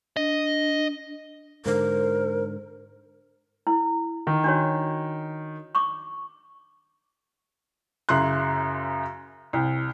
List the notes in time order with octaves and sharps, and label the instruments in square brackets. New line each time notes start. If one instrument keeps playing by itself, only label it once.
[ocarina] D4 [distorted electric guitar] D#5
[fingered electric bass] G#2 D3 [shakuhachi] A#4 [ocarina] C5
[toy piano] E4
[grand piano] D#3
[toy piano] D4 F#4 C#5
C#6 D6
[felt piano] F#2 C#3 E4 C6 F#6
C2